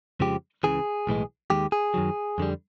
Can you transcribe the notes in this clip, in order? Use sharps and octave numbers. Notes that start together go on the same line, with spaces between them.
F2 C#3 F3 G#3 G4
C#2 C#3 E3 G#4
B1 A2 E3 G#3
D#2 D#3 G#3 G4
G#4
F#2 D#3 F#3
F2 D3 G3